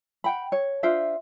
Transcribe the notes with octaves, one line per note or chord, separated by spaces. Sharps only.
F#5 G5 B5
C#5
D4 F4 C5 E5